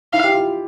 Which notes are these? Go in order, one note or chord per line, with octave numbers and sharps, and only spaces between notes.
E4 F5
G4
F4